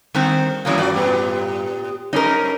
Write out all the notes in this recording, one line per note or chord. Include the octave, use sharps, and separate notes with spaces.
D#3 G3 C4
C3 E3 F3 G3 A#3 C#4
G2 E3 F#4 D5
A2 B3 G4
F#2 C#4 D#4 A#4